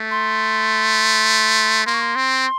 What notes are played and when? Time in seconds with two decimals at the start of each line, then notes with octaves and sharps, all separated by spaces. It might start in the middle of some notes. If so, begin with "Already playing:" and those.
Already playing: A3
0.11 C6
1.86 A#3 C6
1.94 C#6
2.01 C6
2.16 C4